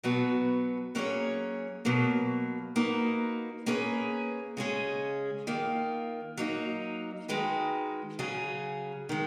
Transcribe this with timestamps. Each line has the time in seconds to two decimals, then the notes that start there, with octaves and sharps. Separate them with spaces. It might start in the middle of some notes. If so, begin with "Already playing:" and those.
0.03 B2 F#3 B3 F#4 B4
0.95 F#3 A#3 C#4 G#4 C#5
1.85 B2 F#3 A#3
2.76 A#3 D#4 F#4 B4
3.66 A#3 C#4 G#4 B4
4.57 C#3 G#3 C#4 G#4
5.47 D#3 A#3 F4
6.37 F#3 A#3 D#4
7.28 D#3 G#3 D#4 F#4 B4
8.19 C#3 F#3 C#4 G#4
9.09 D#3 G#3